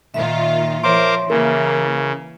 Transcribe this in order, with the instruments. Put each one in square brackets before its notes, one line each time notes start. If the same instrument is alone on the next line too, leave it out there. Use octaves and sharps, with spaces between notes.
[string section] A#2 D#3 F4 [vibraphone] E5
[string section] F3 [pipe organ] A#4 C5 D6 [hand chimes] C#5 C6
[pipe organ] C#3 [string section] E3 A#3 [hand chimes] A#4